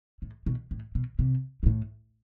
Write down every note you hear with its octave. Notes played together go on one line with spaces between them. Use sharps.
A2
B2
A2
B2
C3
B2
A2